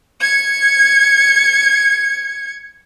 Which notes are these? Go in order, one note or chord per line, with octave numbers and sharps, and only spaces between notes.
G#6 C#7